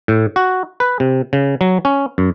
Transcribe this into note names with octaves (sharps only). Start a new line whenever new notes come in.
A2
F#4
B4
C3
C#3
F#3
C#4
F#2